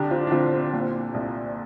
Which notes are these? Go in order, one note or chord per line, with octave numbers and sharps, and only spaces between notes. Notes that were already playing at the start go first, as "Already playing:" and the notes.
Already playing: C2 D3 D4 G4
C4 F4
D4
D3 C4 F4
C4
A#2
C2